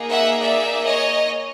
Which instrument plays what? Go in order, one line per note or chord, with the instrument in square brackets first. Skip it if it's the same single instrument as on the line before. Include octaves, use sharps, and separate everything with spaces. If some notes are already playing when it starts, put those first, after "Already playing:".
Already playing: [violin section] A#3 D#4 G#4
E5 F#5
D5 E5
C#5 D#5